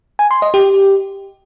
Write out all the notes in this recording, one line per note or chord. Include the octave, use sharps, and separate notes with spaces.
G#5
C6
D#5
G4